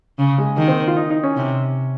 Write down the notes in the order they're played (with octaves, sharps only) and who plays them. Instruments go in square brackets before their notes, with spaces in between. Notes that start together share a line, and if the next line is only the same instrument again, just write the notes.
[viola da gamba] C#3
[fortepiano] G#3
[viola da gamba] D#3 [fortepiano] A#3
[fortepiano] C4
F4
D#4
D#4
C#4
[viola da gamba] C3